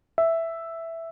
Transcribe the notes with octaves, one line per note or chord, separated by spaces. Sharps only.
E5